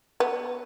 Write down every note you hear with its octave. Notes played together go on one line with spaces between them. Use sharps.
B3